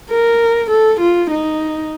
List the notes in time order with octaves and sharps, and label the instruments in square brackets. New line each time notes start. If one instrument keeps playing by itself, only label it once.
[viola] A#4
A4
F4
D#4